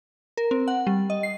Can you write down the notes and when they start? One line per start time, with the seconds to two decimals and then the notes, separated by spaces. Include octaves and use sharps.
0.37 A#4
0.51 C4
0.68 F#5
0.87 G3
1.10 D#5
1.23 C7